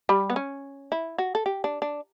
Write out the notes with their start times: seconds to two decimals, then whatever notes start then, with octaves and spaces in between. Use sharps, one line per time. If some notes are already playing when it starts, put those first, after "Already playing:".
0.09 G3
0.30 B3
0.36 C#4
0.92 E4
1.18 F#4
1.35 A4
1.46 G4
1.64 D4
1.82 D4